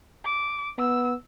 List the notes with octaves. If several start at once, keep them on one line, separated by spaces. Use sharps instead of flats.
D6
B3 E6